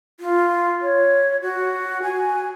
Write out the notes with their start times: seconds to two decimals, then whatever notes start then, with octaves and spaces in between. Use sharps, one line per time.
0.20 F4
0.82 C#5
1.42 F#4
2.03 G#5